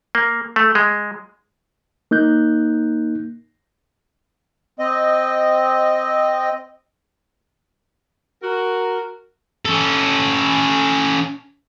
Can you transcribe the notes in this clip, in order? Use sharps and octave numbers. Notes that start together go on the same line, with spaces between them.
A#3
A3
G#3
A#3 D#4 F#6 G6
C4 D#5
F#4 A#4
C#4 A4